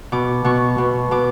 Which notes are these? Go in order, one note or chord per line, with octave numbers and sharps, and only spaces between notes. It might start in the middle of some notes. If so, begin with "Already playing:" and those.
B2 D6
B2 C#6
B2
B2 D6